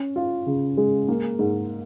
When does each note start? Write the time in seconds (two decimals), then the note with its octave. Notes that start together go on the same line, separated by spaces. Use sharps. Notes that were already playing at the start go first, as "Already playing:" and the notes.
Already playing: C#4
0.16 F4
0.46 C#3
0.77 G#3
1.08 A#3
1.39 G#2